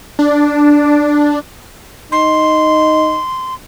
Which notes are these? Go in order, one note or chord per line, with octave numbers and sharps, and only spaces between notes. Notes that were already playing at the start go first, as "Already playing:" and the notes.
D4
D#4 C6